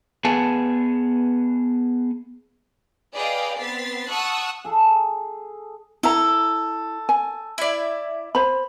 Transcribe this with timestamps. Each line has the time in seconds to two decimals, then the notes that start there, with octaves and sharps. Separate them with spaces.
0.25 B3 G#4 B4 F#5 G#5 A5
3.14 G#4 B4 D5 D#5 F5 G5
3.58 B3 C4 A6 B6 C7
4.08 F#5 A5 C#6 D#6 E6 F#6
4.65 G#4 A4
6.03 E4 A4 A#5
7.09 G#5
7.58 E4 D5
8.35 C5 B5